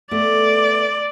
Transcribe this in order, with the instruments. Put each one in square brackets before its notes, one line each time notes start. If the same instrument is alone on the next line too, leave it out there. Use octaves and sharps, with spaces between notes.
[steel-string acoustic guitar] A3 B3 [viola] D5